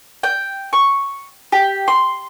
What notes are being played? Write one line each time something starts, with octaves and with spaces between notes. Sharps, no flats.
G5
C#6
G4
C6